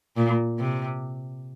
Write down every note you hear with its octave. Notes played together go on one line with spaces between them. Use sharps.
A#2
C3